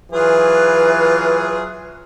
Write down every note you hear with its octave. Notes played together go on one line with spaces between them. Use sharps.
E3 F#3 F4 G#4 B4